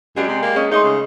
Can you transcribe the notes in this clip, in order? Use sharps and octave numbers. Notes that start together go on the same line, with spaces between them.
F#2 G#3 D4 G4 G#4
C3
A#3
C#4 D4 D#5
G#3 A3 D#4 D#5 C6
C#3